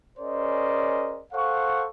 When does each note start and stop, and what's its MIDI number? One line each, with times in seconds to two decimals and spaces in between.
0.18 1.22 61
0.18 1.22 68
0.18 1.22 70
0.18 1.22 72
0.18 1.22 74
0.18 1.22 75
1.33 1.86 69
1.33 1.86 72
1.33 1.86 77
1.33 1.86 78
1.33 1.86 85